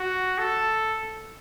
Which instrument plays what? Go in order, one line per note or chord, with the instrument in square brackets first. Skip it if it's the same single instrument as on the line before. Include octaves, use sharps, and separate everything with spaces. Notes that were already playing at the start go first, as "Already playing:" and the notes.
Already playing: [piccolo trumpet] F#4
A4